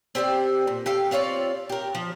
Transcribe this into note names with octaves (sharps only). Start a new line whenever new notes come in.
C4 G4 C5 D5
A#2
G4 A4 F5
C4 F4 C#5 D5
G4 A#4
F3